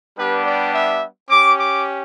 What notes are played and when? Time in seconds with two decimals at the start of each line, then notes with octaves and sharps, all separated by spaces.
0.16 G3 B3 D4 G4 B4
0.45 D5
0.73 E5
1.30 C#4 G4 D6
1.57 D6